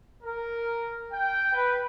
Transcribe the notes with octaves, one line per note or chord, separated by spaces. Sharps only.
A#4
G5
B4